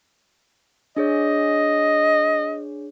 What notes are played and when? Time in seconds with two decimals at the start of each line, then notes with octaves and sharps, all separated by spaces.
0.97 D4 G#4 C#5 D#5